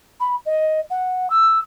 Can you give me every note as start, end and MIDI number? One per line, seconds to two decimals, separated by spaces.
0.20 0.36 83
0.46 0.80 75
0.90 1.29 78
1.30 1.59 88